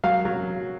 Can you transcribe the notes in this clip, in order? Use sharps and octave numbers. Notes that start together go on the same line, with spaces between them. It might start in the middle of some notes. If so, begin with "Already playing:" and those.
F#3 F5
F#3